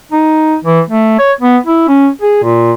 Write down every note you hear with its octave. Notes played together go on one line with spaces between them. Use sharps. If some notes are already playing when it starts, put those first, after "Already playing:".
D#4
E3
A3
C#5
B3
E4
C#4
G#4
A#2